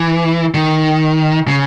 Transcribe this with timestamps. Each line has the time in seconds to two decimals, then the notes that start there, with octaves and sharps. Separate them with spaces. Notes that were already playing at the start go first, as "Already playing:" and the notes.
Already playing: E3
0.54 D#3
1.48 C#3